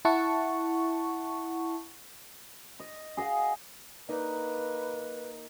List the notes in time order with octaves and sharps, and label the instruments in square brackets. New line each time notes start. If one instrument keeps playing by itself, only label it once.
[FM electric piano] E4 F#5 A5 C#6
[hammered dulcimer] D#5
G#4 D#5 F5 F#5
[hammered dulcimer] A#3 D#4 [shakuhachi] B4